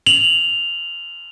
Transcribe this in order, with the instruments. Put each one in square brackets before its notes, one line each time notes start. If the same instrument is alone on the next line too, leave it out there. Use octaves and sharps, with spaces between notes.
[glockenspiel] F7 F#7